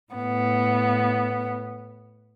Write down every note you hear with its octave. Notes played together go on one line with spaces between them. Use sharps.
A2 B3